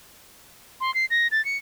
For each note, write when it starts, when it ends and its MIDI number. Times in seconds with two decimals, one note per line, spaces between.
0.81 0.94 84
0.94 1.06 96
1.10 1.27 94
1.31 1.44 93
1.45 1.58 97